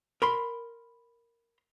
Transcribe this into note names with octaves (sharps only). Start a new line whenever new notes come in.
A#4 B5 C6